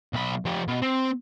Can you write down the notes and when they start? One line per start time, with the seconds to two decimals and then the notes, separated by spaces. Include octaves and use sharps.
0.13 B1 B5
0.45 F3 G4
0.68 B2
0.82 C4